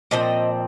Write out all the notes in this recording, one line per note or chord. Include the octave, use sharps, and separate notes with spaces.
A#2 F3 C4 D#5